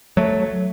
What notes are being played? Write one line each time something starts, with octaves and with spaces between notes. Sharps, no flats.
F#3 A3